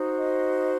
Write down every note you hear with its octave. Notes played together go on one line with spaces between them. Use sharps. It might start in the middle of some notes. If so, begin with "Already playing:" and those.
Already playing: D#4 F#4 C5
D#5